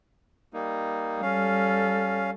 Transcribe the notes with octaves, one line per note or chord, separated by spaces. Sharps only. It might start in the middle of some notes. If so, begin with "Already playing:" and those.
G3 A#3 D#4
G3 C#4 A4 F5